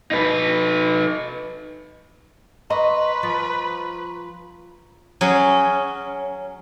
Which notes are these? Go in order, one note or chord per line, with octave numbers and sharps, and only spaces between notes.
D#4 B4
B4 D#5 A#5 C6 C#6
F3
F#3 C#4 G#4